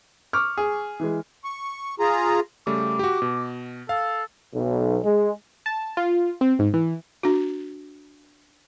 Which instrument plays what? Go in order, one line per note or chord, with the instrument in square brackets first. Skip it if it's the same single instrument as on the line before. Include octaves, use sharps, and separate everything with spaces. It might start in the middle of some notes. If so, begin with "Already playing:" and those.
[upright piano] C#6 D6 F6
[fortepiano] G#4
[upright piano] E3 G#3
[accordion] C#6
F4 G#4 A#5
[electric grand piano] C#3 G3 A3 [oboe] D6
[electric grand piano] F#4 G4
B2
[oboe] A4 [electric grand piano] F5
[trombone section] B1
G#3
[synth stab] A5
F4
C4
G#2
E3
[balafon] D4 F#4